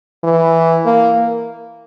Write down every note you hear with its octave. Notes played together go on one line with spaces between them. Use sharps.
E3
A#3